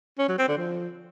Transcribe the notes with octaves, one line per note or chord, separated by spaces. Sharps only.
C#4
F#3
C4
D3
F3